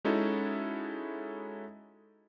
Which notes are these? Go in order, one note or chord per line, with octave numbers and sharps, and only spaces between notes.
G#3 C#4 D#4 E4 F#4 A4